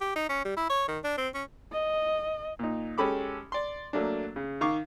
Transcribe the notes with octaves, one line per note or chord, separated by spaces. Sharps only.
G4
D#4
C#4
G3
E4
C#5
D#3
D4
C4
C#4
D#5
A#2 D#4
G#3 C#4 G4 A4 B5 D6
D5 C6
F#3 A3 A#3 D4
C#3
D#3 F5 C#6 D6